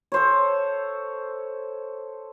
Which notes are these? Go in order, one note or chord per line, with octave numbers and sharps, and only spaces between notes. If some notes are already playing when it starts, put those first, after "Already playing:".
A4 C5 C#5